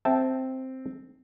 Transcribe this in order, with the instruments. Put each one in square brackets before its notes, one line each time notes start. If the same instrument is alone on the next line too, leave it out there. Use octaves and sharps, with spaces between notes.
[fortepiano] C4 [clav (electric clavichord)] E5 G5 A5